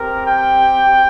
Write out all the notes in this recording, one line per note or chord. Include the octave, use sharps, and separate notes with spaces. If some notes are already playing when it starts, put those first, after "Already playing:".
Already playing: C4 G4 A#4
G5